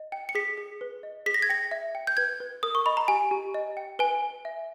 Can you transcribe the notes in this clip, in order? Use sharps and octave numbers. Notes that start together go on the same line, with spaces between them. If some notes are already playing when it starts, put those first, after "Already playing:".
Already playing: D#5
G5
C#7
G#4 B6
G#4
B4
D#5
G#4 B6
A#6
G#6
G5 A#6
E5
G5
G6
B4 G#6
B4
A#4 D#6
C#6
D#5 B5
A#5
G4 G#5
G4
D#5
G5
B4 G#5
B4
E5